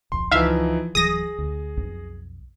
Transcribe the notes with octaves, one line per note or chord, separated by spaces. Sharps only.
D1 A#1 F2 C6
C#2 E3 F3 D#4 E5 F5
D1 E3 F#3 G#4 D#6 A#6
D2
B1 F2